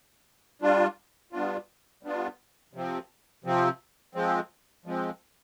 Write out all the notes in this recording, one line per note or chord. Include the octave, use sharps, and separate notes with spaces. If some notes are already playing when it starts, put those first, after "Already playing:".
G3 D4 F4
G3 B3 D4 F4
G3 B3 D4 F4
C3 F3 C4
C3 F3 C4
F3 G#3 C4
F3 G#3 C4